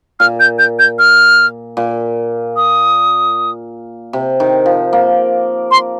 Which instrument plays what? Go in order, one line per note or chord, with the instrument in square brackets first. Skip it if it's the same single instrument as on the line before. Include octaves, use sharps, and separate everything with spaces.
[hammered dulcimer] A#2 [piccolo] F6
[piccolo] G6
G6
G6
F6
[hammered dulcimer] A#2
[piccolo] D#6
[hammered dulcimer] C3
D#3
F3
A#3
[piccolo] C6